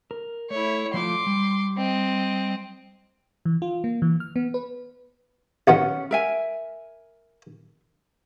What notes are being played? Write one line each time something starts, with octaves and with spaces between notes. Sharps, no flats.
A#4
A3 E4 C#5
F3 A3 F4 C6 D6
G3
C4 D#5
E3
F4
A#3
E3
F6
B3
B4
B1 B2 D#3 C#4 F#5
A#4 E5 G#5